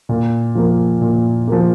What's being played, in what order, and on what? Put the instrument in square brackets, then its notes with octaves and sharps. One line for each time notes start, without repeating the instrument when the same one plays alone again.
[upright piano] A#2
F3 A#3
A#2
F3 A#3